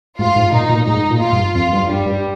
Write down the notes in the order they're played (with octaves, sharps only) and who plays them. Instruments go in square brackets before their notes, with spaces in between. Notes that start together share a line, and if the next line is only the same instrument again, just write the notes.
[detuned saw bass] G#2 [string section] F4
[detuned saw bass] G#2
[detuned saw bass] A#2 [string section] D#4
[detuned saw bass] A#2
[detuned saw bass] G#2 [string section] D#4
[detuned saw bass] A#2
[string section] F4
[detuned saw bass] G2
[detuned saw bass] F2 [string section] F4
[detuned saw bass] G2
[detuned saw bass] G2 [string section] G3
[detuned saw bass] G2